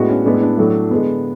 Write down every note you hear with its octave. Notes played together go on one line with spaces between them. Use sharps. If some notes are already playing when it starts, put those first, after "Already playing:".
Already playing: A2 G#3 B3 D4 F#4
C#4
A2 G#3 B3 D4
E4
D4
A2 F#3 A3
D3 G#3 B3